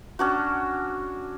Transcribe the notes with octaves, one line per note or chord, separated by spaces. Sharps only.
C#4 D4 F#4